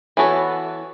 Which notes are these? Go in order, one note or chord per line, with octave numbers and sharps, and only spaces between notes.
E3 B3 F#4 A4 C#5